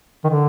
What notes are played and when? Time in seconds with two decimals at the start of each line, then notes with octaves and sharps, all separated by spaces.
0.24 D#3
0.29 D3